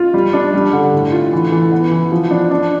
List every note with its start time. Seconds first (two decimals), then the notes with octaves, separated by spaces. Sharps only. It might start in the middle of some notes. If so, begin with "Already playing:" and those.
Already playing: F4
0.14 G3
0.33 D4
0.54 G3
0.73 D3
0.93 A2
1.12 F4
1.33 E3
1.52 E3
1.72 B3
1.92 E3
2.12 F3
2.31 D4
2.51 D4